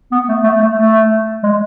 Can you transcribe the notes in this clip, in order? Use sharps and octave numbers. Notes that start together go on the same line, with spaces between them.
B3
A3
A3
A3
A3
G#3